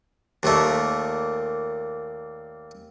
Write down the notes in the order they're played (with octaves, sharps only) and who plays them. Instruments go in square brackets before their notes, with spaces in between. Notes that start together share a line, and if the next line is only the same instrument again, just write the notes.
[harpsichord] D#2 A#2 A3